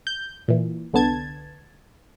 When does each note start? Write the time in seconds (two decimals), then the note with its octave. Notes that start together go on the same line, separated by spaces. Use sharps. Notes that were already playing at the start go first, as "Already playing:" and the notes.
0.07 G6
0.48 A#2 E3
0.93 C2 D3 B3 A5 G#6